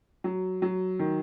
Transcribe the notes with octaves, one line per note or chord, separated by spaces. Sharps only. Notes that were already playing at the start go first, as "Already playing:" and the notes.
F#3
F#3
D#3